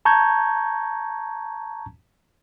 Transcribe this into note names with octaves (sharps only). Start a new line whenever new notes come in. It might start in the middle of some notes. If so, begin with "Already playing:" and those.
A5 A#5 C#6 G6 G#6